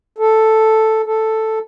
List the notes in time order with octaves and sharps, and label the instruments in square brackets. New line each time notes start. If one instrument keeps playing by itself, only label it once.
[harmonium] A4
A4